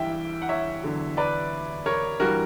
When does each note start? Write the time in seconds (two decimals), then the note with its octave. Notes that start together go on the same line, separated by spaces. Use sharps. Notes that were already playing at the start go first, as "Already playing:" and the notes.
Already playing: G2 E3 G3 E5 G5
0.42 F#5
0.49 C#5 E5
0.83 E2 D3 F#3
1.17 B4 D5
1.86 A#4 C#5
2.20 G2 E3 G3 F#4 A#4